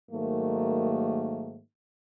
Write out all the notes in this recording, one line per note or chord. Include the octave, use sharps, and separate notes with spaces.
G#2 D#3 F#3 A3 A#3